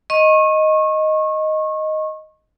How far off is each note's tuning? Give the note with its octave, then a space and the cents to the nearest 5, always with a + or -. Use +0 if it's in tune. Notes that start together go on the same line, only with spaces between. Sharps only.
D#5 +0 C#6 -30